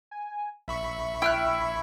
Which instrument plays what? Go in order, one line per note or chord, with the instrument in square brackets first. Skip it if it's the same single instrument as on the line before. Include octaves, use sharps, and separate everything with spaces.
[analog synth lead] G#5
[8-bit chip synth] A#1 B5 C#6 [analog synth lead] E5
[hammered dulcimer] E4 [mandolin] G5 F6 F#6